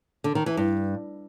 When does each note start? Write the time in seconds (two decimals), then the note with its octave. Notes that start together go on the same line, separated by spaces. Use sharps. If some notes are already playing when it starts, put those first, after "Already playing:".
0.24 D3
0.35 D#3
0.46 E3
0.57 G2